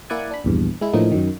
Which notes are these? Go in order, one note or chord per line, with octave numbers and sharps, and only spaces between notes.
A#3 E4 D5 F#5 G#5
D4 B5
A#1 E2 G2
G#3 E4
A2 D3 E3 F3 A#3 D#4
F#2 D#3